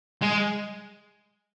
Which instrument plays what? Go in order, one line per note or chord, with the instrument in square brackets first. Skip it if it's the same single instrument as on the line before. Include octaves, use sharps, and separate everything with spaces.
[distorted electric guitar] G#3